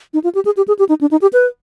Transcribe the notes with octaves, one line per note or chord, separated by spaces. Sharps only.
D#4
F4
G4
G#4
G4
G#4
G4
D#4
D4
D#4
G4
B4